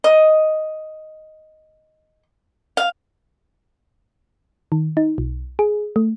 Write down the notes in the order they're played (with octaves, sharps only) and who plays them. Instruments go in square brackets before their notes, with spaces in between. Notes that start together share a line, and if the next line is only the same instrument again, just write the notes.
[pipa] D#5
F5
[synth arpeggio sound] D#3
D#4
B1
G#4
A3